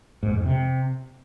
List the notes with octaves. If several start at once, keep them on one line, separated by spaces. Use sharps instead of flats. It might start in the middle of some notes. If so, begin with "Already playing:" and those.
G#2
F2
C3